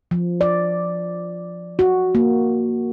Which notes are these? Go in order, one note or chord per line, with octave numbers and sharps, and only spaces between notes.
F3
D5
F#4
A#3